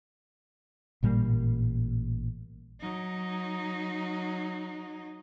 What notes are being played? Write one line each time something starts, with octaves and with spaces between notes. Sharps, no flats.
A1 A#2 G3 A#3
F#3 D#4